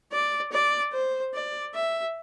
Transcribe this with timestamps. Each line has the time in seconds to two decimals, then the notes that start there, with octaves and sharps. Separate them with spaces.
0.12 D5
0.52 D5
0.93 C5
1.34 D5
1.74 E5